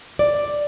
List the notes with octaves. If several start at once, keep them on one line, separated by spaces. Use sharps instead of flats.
D5